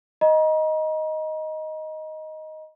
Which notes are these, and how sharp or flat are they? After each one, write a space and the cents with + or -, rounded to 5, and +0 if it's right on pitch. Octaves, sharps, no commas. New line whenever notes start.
D#5 +5 A#5 +40